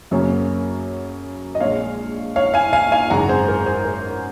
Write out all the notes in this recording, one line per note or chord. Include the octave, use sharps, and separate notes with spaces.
F#2 C#3 F#3 A#3 C#4
D#5
A#1 A#2 G#3 C#5 F5
C#5 F5
F5 G#5
F5 G#5
F5 G#5
G#1 F#2 C#3 G#3 F#5 A#5
G#4 C5
A#4
G#4 C5
A#4